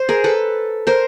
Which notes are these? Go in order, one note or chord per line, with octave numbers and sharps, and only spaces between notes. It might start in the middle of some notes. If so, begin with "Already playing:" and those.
Already playing: C5
G#4 A#4
A4 B4
A#4 C5